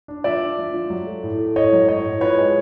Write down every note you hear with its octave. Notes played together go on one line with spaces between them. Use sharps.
D4
F3 D5 E5
D4
F3
F3
F#3
A3
A2
A3
A2 C#5 D#5
F#3
A2 C#5 D#5
A2
F3 B4 C#5
G#3